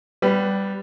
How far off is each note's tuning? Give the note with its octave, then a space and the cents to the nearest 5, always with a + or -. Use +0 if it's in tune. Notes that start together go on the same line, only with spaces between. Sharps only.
G3 +0 B3 +0 B4 +15